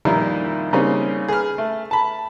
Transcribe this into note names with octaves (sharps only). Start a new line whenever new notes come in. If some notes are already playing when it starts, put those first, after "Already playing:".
F2 A#2 D#3 G3 D#4 E4
C#3 G3 A#3 C4 D#4
G#4 B4 F6
A3
A5 B5